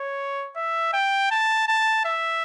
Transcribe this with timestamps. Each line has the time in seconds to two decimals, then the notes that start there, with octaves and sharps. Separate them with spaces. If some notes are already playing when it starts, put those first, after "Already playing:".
Already playing: C#5
0.56 E5
0.93 G5
1.31 A5
1.68 A5
2.05 E5